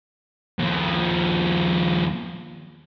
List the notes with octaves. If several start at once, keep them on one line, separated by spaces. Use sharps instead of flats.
D#2 F3